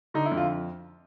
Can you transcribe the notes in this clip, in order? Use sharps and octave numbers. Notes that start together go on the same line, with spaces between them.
D3 D#4
E4
F2
F4